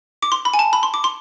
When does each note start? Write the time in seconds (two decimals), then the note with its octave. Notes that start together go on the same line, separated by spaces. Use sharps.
0.23 D6
0.32 C6
0.45 B5
0.54 G#5
0.59 A5
0.73 B5
0.83 C6
0.94 D6
1.04 C6